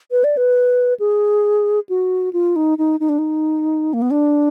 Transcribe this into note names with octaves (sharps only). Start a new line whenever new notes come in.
B4
D5
B4
G#4
F#4
F4
D#4
D#4
D#4
D4
D#4
A#3
B3
D4